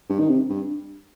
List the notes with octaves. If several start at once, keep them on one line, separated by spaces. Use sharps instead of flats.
G2
D#3
C3
G2